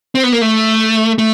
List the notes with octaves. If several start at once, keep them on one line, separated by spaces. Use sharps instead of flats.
C4
B3
A#3
A3
A3